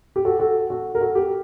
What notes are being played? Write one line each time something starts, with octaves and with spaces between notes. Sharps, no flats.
G4
F#4 A4
F#4 A4
F#4 A4
A#4
F#4 A4
G4